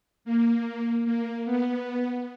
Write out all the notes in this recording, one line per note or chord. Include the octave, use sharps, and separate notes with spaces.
A#3
A#3
B3